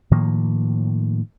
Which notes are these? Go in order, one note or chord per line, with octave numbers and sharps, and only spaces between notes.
A2 D#3 F3 A#3